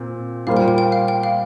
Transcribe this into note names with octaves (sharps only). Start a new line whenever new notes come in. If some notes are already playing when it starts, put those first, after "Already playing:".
Already playing: A#2 C4
A#2 G3 A#3 F4 C5 F5
G5
G5
G5
F5
G5
F5